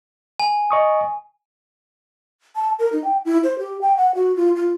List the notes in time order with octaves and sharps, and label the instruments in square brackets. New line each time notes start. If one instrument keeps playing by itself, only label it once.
[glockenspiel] G#5
[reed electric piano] D#5 C#6 D#6
[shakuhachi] A5
A#4
D#4
G5
E4
C5
G4
G5
F#5
F#4
F4
F4